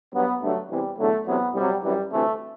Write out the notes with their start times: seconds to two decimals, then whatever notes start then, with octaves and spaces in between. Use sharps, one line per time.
0.14 G2 F#3 B3
0.41 G2 D3 F#3 A3
0.71 E2 C3 E3 G3
0.98 E2 D3 F#3 A3
1.27 E2 C3 F#3 B3
1.55 C2 C3 F#3 G3
1.83 F#2 E3 G3
2.12 D2 C3 E3 A3